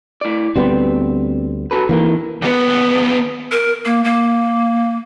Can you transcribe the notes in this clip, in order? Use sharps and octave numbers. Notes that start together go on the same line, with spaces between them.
A2 D5
D2 G3 B3 C4
F#4 A4 B4
F2 D#3 E3 A#3
D#2 B3
A#4
A#3
A#3